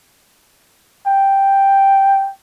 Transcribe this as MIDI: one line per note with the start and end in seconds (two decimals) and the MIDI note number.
1.07 2.30 79